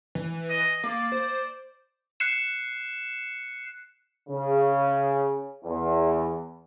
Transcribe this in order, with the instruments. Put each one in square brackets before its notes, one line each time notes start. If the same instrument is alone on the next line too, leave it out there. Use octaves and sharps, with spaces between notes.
[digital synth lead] E3
[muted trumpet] D#5
[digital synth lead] A#3 [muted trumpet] D5
[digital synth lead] C5
[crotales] F#6 C7 C#7 E7
[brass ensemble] C#3
E2